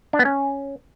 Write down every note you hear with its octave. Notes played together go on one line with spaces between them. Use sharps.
D4
B3
C#4